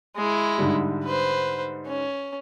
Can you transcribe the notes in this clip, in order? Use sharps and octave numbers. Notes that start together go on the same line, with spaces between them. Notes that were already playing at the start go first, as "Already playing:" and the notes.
G#3 E4
G#2 D3 G3
B4 C5
C#4